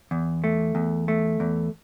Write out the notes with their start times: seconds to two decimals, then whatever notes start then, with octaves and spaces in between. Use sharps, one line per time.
0.11 E2
0.44 A3
0.75 E2
1.08 A3
1.40 E2